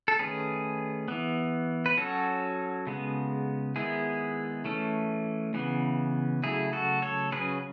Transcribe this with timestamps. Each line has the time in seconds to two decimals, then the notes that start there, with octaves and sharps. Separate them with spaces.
0.08 A4
0.19 D#3 A3 C#4 G#4 B4
1.08 E3 B3
1.86 B4
1.98 F#3 C#4 F#4 A4
2.87 C#3 G#3 B3
3.76 D#3 G#3 B3 E4 G#4
4.65 E3 A3 C#4
5.54 C#3 E3 B3
6.43 C#3 F#3 A3 E4 G#4
6.73 F#4 A4
7.02 A4 C#5
7.32 C#3 F#3 C#4 G#4 B4